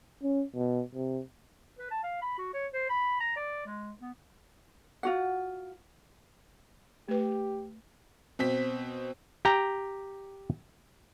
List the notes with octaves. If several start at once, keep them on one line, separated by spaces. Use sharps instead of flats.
C#4
B2
C3
B4
A5
F5
B5
F#4
C#5
C5
B5
A#5
D5
G#3
B3
F4 F#4 F#5
A3 G4 B4
B2 C4 B6
G4 G5 A#5